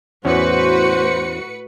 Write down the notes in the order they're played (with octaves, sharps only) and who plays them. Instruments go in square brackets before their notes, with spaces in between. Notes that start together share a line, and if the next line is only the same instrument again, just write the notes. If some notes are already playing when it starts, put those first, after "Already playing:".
[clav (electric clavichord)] E2 C#4 [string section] A2 B4 C#7 [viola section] F#4 [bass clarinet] C5